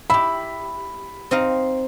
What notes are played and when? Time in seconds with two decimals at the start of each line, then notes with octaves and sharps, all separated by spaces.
0.10 E4 G4 B5
1.31 C4 D#4 F5